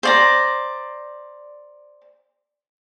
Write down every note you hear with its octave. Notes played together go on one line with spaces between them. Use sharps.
C5 D5 A#5